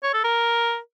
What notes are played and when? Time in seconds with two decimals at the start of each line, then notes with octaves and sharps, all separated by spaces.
0.04 C#5
0.14 A4
0.24 A#4